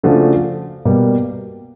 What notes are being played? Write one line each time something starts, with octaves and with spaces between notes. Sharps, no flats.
C#3 F3 A3 D4 F#4
B2 G3 A#3